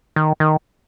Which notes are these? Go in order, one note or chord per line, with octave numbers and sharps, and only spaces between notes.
D#3
D#3